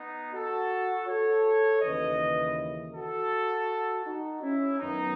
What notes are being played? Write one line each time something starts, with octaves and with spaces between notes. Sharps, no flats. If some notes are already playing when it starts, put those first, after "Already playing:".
Already playing: B3 D#4
F#4 A4
A4 C#5
D#2 C#3 E3 B4 D#5
F#4 A4
D#4 F#4
C#4 E4
F#2 D#3 F#3 B3 D#4